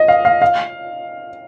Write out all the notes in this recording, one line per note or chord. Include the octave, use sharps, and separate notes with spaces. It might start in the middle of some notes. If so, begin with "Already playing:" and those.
Already playing: D#5
F5
F5
F5